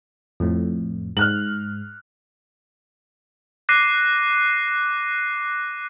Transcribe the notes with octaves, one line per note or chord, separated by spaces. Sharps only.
F2 A2
G#2 F6 F#6 F#7
D6 F#6 A#6 C7 D#7